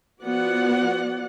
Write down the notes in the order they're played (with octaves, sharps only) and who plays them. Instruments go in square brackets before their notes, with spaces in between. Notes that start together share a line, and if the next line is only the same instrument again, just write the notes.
[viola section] F3 B3 F#4 D5 F#5